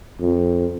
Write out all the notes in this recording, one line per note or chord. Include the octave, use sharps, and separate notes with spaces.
F2